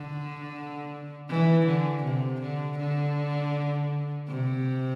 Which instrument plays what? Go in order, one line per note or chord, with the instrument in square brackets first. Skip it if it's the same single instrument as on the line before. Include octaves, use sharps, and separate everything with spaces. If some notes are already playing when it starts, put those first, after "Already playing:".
Already playing: [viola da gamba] D3
E3
D3
C3
D3
D3
C3